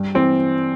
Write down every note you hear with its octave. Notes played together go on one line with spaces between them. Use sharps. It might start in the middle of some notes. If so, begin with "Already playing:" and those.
Already playing: G2
E3 C4